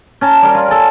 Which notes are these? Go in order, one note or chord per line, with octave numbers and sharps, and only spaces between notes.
C#4 A5 A#5
G3 A#4
F4
A4 G#5